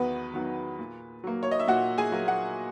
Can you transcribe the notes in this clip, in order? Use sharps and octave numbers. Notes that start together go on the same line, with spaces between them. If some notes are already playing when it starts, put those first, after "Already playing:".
Already playing: E2 D#3 F#3 B3 B4
D#3 F#3 B3
A#2
F#3 A#3
C#5
D#5
E5
A#2 F#4 F#5
G#4 G#5
F#3 A#3
F#4 F#5